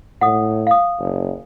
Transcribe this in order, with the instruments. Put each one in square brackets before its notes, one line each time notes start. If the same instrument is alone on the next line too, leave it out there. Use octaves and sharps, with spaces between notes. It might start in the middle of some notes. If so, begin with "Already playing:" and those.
[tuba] A2 [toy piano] F#5 D#6
[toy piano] F5 D#6
[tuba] F#1